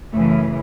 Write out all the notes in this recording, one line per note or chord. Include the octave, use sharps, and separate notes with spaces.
F#2 C#3 E3 A3